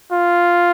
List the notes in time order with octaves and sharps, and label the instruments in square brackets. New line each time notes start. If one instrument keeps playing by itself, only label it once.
[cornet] F4